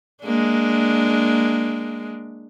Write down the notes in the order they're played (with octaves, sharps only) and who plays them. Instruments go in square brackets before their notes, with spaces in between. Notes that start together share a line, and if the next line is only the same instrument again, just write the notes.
[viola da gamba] G#3 A#3 D4